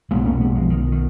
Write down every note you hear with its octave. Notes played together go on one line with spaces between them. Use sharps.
B1 B2 G#3 B3
A#3 C#4
G#3 B3
F3 G#3
D#3
D#3